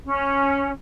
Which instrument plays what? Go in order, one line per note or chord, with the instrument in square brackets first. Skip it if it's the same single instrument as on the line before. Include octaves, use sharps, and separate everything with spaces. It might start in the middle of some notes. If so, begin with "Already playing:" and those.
[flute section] C#4